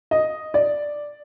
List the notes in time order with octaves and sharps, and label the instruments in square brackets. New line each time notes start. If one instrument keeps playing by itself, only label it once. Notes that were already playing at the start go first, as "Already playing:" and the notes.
[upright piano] D#5
D5